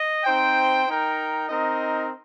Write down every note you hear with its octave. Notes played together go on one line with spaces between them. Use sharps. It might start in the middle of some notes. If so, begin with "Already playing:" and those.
Already playing: D#5
C4 D#4 C5 G5
D#4 A#4 G5
C4 D#4 A#4 D#5